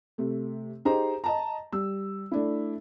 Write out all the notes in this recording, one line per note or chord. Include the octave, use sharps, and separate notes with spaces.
C3 A3
D#4 G4 G#4 C5 A#5
D#5 A5 A#5
G3 E6
A3 D4 E4